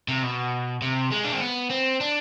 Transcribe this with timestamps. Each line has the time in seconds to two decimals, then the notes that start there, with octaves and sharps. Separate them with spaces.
0.08 C3
0.23 B2
0.82 C3
1.12 G#3
1.24 D4
1.33 C4
1.41 B3
1.71 C4
2.01 D4